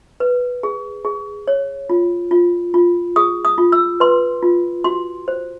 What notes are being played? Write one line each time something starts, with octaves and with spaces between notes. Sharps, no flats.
B4
G#4
G#4
C#5
F4
F4
F4
G#4 D#6
D#6
F4
E6
B4 C6
F4
F#4 C6
C5